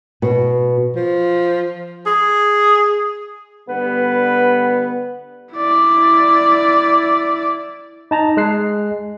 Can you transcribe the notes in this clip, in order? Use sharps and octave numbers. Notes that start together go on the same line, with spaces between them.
B2
F3
G#4
D3 G3 B3 B4
E4 D5
D#4 A5 A#5
G#3 F#6 C7